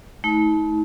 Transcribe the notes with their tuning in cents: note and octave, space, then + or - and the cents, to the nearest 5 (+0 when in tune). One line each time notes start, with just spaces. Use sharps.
A3 -25 D#4 +40